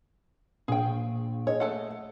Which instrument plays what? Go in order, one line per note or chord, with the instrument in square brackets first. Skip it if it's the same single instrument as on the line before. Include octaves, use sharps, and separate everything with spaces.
[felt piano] A#1 A#2 [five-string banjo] G#4 G5
[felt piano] G#4 D#5 [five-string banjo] C#5
[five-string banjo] A3 A4 F#5